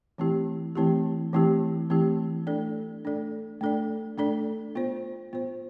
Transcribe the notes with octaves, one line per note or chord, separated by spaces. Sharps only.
E3 A3 C4 E4 G4
E3 A3 C4 E4 G4
E3 A3 C4 E4 G4
E3 A3 C4 E4 G4
A3 D4 A4 D5
A3 D4 A4 D5
A3 D4 A4 D5
A3 D4 A4 D5
B3 F4 C5
B3 F4 C5